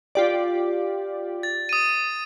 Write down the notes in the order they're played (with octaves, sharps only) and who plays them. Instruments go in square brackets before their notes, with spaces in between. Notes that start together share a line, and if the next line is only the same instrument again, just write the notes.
[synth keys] F4 G4 D5
[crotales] A6
D#6 D#7